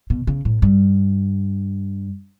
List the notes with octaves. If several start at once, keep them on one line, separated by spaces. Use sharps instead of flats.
B2
C#3
A2
G2